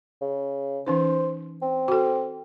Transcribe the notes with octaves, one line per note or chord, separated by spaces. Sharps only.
C#3
E3 C#4 D#4 C5
C4
F#4 A4